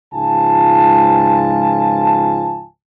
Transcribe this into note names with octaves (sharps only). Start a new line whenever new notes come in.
C#2 G#2 F3 F4 G#5 A5